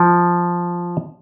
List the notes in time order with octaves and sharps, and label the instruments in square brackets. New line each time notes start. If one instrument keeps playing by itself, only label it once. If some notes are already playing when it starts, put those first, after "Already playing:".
Already playing: [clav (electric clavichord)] F3